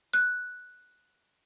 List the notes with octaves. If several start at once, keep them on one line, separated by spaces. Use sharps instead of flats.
F#6